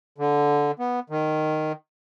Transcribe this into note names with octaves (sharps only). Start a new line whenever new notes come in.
D3
B3
D#3